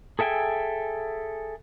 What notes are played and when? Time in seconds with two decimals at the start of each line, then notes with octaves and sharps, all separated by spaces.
0.19 G#4 A4 E5 G5 G#5